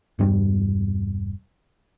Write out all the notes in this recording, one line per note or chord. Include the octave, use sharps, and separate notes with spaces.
E1 G2 G3